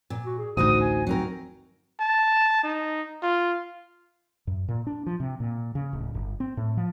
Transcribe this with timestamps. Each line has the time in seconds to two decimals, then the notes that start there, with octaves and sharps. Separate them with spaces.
0.10 A#2
0.25 F#4
0.38 G#4
0.57 A1 D2 D#4 F#4 C5 D#6
0.82 G#5
1.07 F#3 C4 D#4 A#4
1.99 A5
2.63 D#4
3.22 F4
4.47 F#2
4.68 A#2
4.87 D4
5.07 F3
5.20 C3
5.40 A#2
5.75 C#3
5.93 D1
6.14 G1
6.40 C4
6.57 A2
6.77 F3